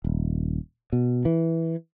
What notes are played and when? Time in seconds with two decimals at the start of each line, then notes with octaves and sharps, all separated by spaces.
0.04 D#1
0.93 B2
1.25 E3